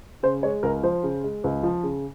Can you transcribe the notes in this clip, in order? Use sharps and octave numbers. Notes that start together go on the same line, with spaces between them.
C#3 C5
G#3 C#5
C#2 A#4
F3 C5
C#3
G#3
C#2
F3
C#3